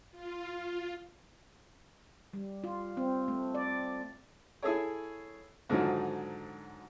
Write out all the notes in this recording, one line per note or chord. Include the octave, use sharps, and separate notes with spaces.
F4
G3
F4
C4
A3
D5
E4 G#4 A4 C#5
G#2 D3 D#3 F3 F#3